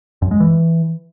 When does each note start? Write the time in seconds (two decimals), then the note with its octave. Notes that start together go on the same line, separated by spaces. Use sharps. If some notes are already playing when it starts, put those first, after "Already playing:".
0.22 F#2
0.31 G#3
0.40 E3